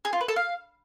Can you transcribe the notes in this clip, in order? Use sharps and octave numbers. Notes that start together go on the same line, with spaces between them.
G#4
F4
B4
A4
F5